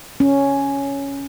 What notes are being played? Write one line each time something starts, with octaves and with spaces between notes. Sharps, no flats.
C#4